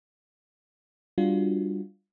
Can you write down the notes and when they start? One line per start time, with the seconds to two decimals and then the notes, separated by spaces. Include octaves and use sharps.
1.18 G3 D4 F4 F#4